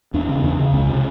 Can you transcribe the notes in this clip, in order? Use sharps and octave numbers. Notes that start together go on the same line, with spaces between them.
E2 D4
C#3 C#4
C#4
E2 D4
C#3
C#2 C#4
C3